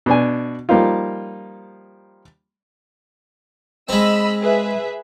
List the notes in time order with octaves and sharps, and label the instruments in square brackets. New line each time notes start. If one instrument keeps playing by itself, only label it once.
[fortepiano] B2 D4 G#5
F3 G3 A#3 D#4 F4
[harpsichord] G#3 C4 [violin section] D#5 B5 E6
[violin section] G#4 B4 E5